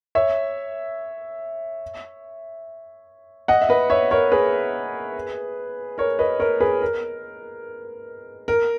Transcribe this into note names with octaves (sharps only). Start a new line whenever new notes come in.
C#5 E5
D#5 F#5
E5
B4 D#5
C#5 E5
A#4 C#5
G#4 B4
A#4 C#5
B4 D#5
A#4 C#5
G#4 B4
A#4
A#4